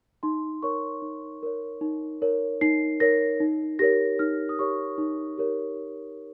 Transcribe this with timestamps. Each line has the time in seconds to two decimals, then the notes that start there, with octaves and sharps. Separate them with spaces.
0.23 D#4 C6
0.63 A#4 C#5 C#6
1.02 D#4
1.43 A#4 C#5
1.81 D#4
2.22 A#4 C#5
2.61 D#4 C7
3.00 A#4 C#5 A#6
3.40 D#4
3.79 G4 A#4 C#5 A#6
4.19 D#4 F6
4.49 D#6
4.59 G4 A#4 C#5 C#6
4.98 D#4
5.38 G4 A#4 C#5